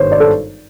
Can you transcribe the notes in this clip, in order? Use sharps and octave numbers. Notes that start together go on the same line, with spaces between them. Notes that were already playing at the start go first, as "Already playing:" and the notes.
Already playing: G#1 G2 C5 C#5
D5
A4